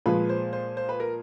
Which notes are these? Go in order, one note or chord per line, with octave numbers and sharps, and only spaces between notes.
A#2 F3 G#3 B4
C5
C5
C5
B4
A#4